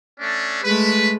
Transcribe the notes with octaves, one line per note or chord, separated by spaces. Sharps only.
A3 C#4 D4
G#3 A3 B4